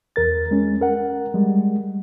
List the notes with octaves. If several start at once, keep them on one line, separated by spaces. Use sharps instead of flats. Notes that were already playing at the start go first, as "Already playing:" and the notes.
E2 A#4 A6
G#3 C#4
A#4 F#5
G3 G#3